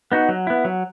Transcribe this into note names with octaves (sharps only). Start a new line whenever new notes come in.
B3 D#4 F#4
F#3
B3 E4
F#3